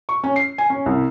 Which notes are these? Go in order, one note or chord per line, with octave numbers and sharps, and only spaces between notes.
C#6
C#4
C7
G#5
C#4
C2